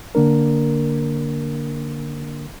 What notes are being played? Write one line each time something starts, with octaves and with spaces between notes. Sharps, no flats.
D3 A#3 D4 A#4